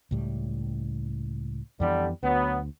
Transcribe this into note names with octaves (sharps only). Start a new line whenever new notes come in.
C#2 A2 G3
F2 D3 E3 G3 B3
D2 F#3 B3